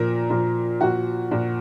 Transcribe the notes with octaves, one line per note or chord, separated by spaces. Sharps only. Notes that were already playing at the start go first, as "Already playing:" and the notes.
Already playing: A#2 F3 A#4
A#2 F3
A#2 F3 F#4
A#2 F3